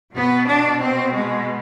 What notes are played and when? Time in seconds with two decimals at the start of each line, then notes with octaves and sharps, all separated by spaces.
0.13 B2 B3
0.47 D4
0.80 C4
1.13 G#3